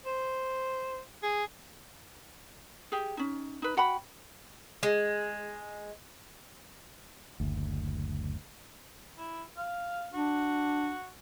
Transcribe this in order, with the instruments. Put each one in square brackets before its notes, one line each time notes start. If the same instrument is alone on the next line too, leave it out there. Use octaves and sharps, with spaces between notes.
[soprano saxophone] C5
G#4
[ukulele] G4 G#4
C#4 D#4
D#4 B4
F#4 F#5 G5 B5
[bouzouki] G#3
[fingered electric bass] F#1 D2
[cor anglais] E4
F5
[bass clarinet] D4 [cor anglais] F#4